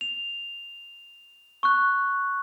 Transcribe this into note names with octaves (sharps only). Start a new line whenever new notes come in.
F7
C#6 F#6